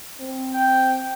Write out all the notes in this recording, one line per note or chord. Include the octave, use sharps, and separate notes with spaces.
C4
G5